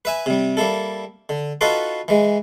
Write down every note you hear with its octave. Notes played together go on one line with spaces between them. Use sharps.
B4 E5 G#5
C3 G3
G3 A#3 E4 A4
D3
D#4 F4 F#4 A4 B4 C6
E3 G#3